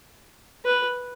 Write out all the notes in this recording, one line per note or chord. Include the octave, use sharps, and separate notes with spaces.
B4